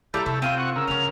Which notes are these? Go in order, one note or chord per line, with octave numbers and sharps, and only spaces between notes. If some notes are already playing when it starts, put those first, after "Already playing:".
G3 A#3 E4 A4 F5 A#5 G6
C3 A3
C4 F4 C5 G5 D#7
F#5 C#6
C#3 A#4 E6
G2 D3 C#4 F#5 F7